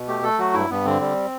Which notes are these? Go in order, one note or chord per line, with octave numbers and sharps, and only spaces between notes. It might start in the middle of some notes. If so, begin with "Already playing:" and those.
Already playing: B2
A3 G4
A3 A4
F#3 F#4
G2 E4
G2 B3
D3 C4
G3